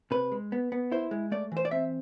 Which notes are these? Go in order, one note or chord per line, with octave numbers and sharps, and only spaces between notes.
C3 B4
G#3
B3
B3
E4 C5
G#3
A3 D5
E3 C5
D5
C4 E5